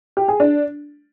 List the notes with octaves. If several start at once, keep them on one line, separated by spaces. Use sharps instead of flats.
G4
G#4
D4